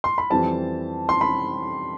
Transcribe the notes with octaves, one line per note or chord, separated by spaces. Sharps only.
C6
B5
F2 E3 G3 C4 A5
C6
B5